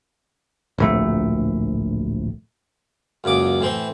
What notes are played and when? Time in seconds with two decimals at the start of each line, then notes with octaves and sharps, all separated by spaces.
0.78 D1 A#1 A3
3.24 C#2 F#2 A#2 D6 D#6
3.61 A2 E3 C4 C5